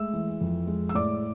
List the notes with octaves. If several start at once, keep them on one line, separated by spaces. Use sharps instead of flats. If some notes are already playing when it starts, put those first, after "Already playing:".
Already playing: G#3 A3 E5 E6
E3
F2
G#3
E6
A2 D5 D6